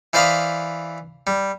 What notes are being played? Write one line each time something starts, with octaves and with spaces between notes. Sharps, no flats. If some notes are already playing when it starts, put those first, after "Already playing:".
E3 C5 D5 F5 B5 D#6
G3